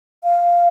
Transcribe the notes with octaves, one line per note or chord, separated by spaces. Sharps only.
F5